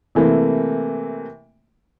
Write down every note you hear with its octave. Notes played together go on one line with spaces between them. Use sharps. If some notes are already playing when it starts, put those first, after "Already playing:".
C3 E3 A3 A#3